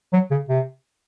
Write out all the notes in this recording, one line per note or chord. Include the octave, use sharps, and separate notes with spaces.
F#3
C#3
C3